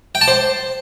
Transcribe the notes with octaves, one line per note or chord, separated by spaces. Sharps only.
G5
A5
C5